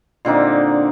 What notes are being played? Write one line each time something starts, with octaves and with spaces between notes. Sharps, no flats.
A#2 D3 C4 D#4